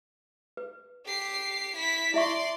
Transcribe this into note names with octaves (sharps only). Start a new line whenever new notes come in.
B4
G4 C7
E4 B6
E4 D5 E5 C6 C#6